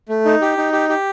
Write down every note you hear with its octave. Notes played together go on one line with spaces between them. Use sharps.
A3
D#4
G4
D#4
G4
G4